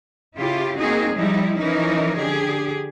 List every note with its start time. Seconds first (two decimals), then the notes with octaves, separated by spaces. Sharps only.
0.36 C#3 E4 F4 G4
0.78 A#3 C4 D#4 F#4 G#4
1.15 F3 G3 D#4 E4
1.58 E3 F3 C#4 D#4 E4 A#4
2.16 D3 G4 G#4